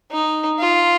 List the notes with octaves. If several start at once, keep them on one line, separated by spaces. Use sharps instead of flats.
D#4
F4